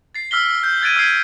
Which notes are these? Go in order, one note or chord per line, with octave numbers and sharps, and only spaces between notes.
A6 C7
E6 F6 B6 G7
G6
F#6 G#6 A6 C7 D7 D#7
E6 G#6 B6 C7 D7